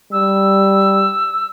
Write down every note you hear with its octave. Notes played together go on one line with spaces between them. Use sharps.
G3 E6